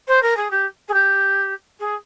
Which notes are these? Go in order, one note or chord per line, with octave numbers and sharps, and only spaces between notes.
C5
A#4
G#4
G4
G#4
G4
G#4